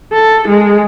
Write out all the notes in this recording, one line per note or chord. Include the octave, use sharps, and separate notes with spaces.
A4
G#3